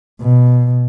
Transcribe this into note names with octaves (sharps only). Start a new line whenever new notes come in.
B2